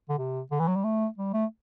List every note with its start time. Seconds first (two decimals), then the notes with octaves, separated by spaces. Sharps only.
0.09 D3
0.18 C3
0.51 D3
0.59 E3
0.68 F#3
0.76 G3
0.84 A3
1.18 G3
1.34 A3